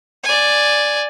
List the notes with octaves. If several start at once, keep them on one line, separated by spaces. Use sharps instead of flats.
D5 G#5